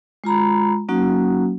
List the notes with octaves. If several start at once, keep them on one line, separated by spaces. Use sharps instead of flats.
G#3 F4 A#5 B5
F#3 A#3 C#4 D#4 F#4